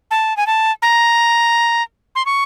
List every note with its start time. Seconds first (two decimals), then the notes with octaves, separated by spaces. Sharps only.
0.11 A5
0.37 G#5
0.47 A5
0.82 A#5
2.15 C6
2.26 C#6